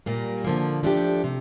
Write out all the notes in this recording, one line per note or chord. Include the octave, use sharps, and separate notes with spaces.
A#2 G3 A#3
D3 F3 A#3
F3 A3 D4 G4
C3